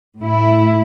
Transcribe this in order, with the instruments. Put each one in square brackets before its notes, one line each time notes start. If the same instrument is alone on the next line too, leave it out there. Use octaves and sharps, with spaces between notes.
[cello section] A2 A3 E4